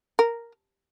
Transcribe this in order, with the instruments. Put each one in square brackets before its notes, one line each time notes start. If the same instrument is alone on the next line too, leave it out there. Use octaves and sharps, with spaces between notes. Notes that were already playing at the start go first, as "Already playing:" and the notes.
[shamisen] A#4